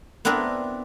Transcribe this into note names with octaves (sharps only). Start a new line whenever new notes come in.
B3 C4 D4 E4 A#4 B4